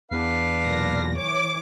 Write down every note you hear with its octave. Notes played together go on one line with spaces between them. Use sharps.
E2 D4 B4 F5
B1 A#2 A#6
E3 C#5 D6